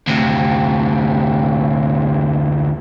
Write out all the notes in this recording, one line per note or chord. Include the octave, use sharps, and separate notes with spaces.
D2 C3